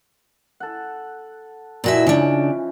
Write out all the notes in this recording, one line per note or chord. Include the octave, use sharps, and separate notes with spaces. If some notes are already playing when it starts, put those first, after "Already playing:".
A4 F#5
A#2 E3 F3 D#4 F#4 E5
C#3 C#4 D4